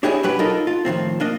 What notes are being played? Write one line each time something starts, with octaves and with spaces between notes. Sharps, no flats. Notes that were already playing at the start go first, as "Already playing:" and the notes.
D4 E4 G4 G#4 C#5 D#5
B1 G2 F#3 G4 B4 B5
D#4 F4 A4 A#4
F4
A2 D#3 F3 C4
A#3 D4 D#5